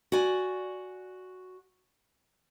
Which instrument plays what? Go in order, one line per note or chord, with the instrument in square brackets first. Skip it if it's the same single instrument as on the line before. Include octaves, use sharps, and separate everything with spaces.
[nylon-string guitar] F#4 D5 G#5